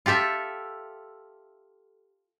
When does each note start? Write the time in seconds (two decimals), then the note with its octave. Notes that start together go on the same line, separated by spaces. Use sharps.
0.06 F4 G4 A4 E5